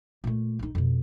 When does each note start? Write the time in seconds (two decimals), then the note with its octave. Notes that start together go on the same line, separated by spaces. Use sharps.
0.24 A#2 A3
0.59 A#1 D#4
0.75 F2 B2